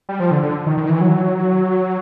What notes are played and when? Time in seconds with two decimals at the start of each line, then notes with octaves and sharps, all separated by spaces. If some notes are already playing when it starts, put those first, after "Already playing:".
0.09 G3
0.20 F3
0.31 D3
0.43 D3
0.67 D#3
0.77 D#3
0.89 E3
1.01 F#3